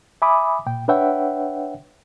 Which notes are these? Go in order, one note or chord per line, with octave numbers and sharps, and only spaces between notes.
E5 G#5 B5 D6 D#6
A#2 G5
D4 B4 C#5 E5 F#5 G5